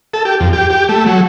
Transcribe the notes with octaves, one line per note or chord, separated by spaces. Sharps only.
A4
G4
F2
G4
G4
A3
F#3